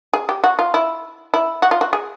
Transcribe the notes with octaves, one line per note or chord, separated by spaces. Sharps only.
G#4
G4
F#4
F4
E4
E4
F#4
F4
F#4
G#4